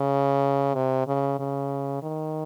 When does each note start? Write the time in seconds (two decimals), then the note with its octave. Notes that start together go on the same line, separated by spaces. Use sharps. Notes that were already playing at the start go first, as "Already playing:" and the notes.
Already playing: C#3
0.75 C3
1.08 C#3
1.40 C#3
2.03 D#3